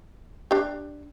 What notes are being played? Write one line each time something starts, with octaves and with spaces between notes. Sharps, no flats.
D4 G4